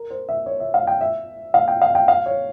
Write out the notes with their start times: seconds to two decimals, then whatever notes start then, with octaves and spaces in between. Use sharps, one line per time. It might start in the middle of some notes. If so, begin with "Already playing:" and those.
Already playing: A#4
0.10 C5
0.29 E5
0.46 C#5
0.60 E5
0.74 F5
0.87 G5
1.01 E5
1.54 F5
1.68 G5
1.82 F5
1.95 G5
2.08 F5
2.26 C#5